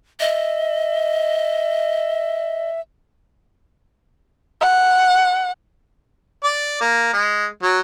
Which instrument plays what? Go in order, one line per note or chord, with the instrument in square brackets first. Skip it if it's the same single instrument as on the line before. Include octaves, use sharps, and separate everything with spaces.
[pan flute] D#5 [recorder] E5
[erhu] F#5
[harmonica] D5
A#3
G#3
F#3